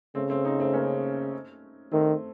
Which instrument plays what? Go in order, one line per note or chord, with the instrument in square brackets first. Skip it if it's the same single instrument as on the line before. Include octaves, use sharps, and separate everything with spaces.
[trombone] C#3 [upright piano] A3 C4
[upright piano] A3 C4
C4 D#4
A3 C4
A#3 C#4
[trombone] D#3 [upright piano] A3 C4